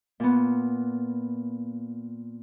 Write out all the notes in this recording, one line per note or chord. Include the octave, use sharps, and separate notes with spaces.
A#2 B3